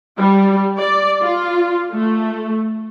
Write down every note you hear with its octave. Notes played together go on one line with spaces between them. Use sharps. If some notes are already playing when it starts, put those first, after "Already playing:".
G3
D5
F4
A3